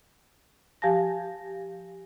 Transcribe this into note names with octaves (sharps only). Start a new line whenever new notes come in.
F3 G4 F5 G#5 A5 A#6